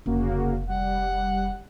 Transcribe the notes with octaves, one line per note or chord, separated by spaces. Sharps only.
F1 C#3 A#3 F#4
G3 F#5